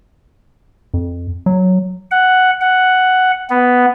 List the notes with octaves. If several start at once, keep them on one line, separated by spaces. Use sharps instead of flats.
F2
F#3
F#5
F#5
B3